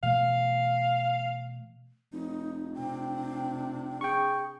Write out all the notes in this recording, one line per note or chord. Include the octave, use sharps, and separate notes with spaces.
B2 E3 A3 F5
F1 D#4
C3 D4 G5
G#4 G5 C#6